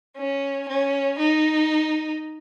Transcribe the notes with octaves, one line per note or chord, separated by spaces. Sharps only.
C#4
C#4
D#4